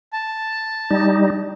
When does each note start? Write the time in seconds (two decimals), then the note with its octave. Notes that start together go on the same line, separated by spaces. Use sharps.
0.13 A5
0.91 G3 D#4